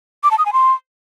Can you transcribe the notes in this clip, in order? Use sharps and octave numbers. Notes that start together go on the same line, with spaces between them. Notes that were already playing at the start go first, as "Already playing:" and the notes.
D6
A5
D#6
G#5
C6